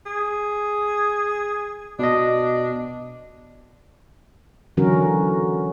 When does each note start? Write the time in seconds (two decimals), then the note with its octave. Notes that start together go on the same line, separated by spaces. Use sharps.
0.06 G#4
1.99 B2 D4 D#5
4.77 D3 E3 F#3 C#4 F#4 A#4